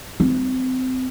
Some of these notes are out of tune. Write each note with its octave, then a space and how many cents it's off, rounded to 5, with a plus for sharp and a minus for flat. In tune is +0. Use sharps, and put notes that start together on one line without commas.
C4 -25